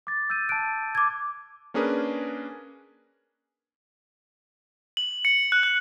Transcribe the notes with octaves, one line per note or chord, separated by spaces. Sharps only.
D6 A6
E6 G6 D#7
A5 F#6 D7
D6 G#6
A#3 C#4 D4 G#4 A#4 B4
F#7
C#7
F#6
F#6